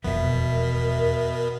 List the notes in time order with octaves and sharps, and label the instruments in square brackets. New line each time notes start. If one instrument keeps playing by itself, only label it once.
[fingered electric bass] E1 F2 F3 [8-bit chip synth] B2 B3 [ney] A#4 [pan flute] E5